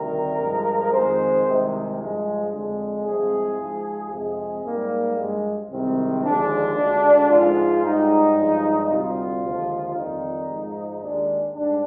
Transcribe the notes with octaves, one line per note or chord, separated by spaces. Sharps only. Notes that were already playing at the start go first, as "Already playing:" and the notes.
Already playing: D2 C3 D#3 G3 A#4
G2 F3 G#3
F2 D#3 G#3 C5
C2 C3 D#3 G#3
G2 F3 G#3
F2 D3 G#3
C2 C3 F3 G#3 G#4
G#2 F3 G#3
F2 C3 F3 G#3 G#4
G#2 G3 A#3
G2 F3 G#3
C2 C3 D#3 G#3 C4
D#2 D3 F3 G#3 D4
D2 D3 G#3
G#2 F3 G#3 F4
G#2 G3 D#4
G2 F3 G#3
D2 C3 G3 F4
D#2 D3 F3 G#3
F2 D#3 G3 D#4
G#2 F3 G#3
D#2 D#3 G#3 D4
G#2 G3 D4